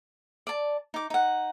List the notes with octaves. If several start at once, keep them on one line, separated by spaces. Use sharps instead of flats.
D5 A5
D#4 D6
D#4 F#5